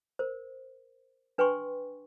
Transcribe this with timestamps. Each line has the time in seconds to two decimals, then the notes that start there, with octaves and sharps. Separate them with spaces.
0.19 A#4 C5
1.38 D4 B4 G5 G#5 C6 C#6